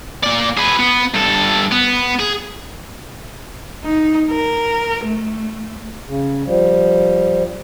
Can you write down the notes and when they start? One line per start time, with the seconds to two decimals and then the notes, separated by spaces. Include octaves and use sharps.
0.23 A#3 D5
0.57 G#4 B4
0.79 B3
1.15 G2 A4
1.72 B3
2.20 G#4
3.84 D#4
4.30 A#4
5.04 A3
6.07 C#3
6.46 F3 G3